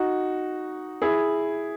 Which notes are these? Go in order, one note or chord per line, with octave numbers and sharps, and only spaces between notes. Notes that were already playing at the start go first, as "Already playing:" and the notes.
Already playing: D#4 F#4
E4 G#4